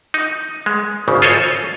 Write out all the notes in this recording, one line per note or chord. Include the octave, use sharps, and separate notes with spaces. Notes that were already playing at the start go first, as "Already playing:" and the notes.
D#4
G#3
G#1 C#3
F4 G#4 A4 C5 C#5 D#5